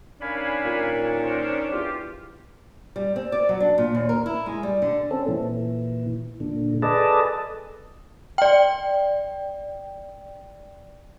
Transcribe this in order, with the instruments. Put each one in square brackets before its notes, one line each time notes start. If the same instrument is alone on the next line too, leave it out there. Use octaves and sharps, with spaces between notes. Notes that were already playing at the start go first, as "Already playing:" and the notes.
[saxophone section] D#3 C#4 D4 [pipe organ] F5 G#5 B5
[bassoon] A#2
[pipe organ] A#4 C5
[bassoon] E2 [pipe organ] F4 G4
[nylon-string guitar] G3
C4
D5
F#3
D4
A#2
D#2
A#4
E4
G#3
G3
D3
[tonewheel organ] C4 C#4 A4
A#2 E3
A#2 D3
G#4 A4 B4 D5 D#5 A5
[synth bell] D5 G5